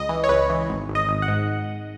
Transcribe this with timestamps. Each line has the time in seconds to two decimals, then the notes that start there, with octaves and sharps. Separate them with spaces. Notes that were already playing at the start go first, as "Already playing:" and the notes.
Already playing: C#2 D#5
0.09 E3
0.24 C#5
0.29 C#2 B4
0.50 E3
0.69 G#1
0.89 G#1
0.95 D#5
1.08 G#1
1.22 F#5
1.28 G#2